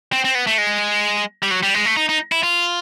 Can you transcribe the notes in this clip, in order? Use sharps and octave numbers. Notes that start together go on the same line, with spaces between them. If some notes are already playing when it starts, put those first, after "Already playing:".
C4
C4
B3
A3
G#3
G3
F#3
G3
G#3
A3
D#4
D#4
E4
F4